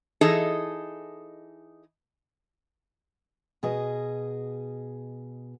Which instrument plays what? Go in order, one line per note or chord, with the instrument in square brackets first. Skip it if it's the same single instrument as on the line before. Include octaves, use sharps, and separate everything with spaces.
[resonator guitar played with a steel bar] E3 D#4 G#4 A4 D#5
[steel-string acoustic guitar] B2 G#4 D#5